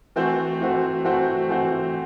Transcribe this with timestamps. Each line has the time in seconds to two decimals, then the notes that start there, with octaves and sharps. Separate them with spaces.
0.16 E3 A3 C4 F#4 C5
0.61 E3 A3 C4 F#4 C5
1.05 E3 A3 C4 F#4 C5
1.49 E3 A3 C4 F#4 C5